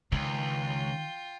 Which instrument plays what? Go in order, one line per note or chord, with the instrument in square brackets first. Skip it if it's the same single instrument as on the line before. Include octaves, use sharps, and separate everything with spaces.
[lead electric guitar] C#2 [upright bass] D#3 [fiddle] F4 G5